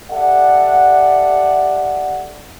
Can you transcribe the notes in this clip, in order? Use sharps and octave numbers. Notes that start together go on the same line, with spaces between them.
G4 A4 D5 E5 F#5